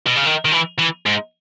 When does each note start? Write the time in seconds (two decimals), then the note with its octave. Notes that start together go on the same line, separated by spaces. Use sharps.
0.06 B2
0.16 C#3
0.25 D#3
0.45 D#3
0.52 E3
0.79 E3
1.06 G#2